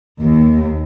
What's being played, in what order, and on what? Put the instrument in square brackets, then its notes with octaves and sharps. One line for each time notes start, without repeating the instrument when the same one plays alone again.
[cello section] D#2